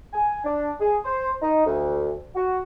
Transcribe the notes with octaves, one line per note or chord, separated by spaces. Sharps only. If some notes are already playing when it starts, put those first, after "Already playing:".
G#5
D4
G#4
C5
D#4
D2
F#4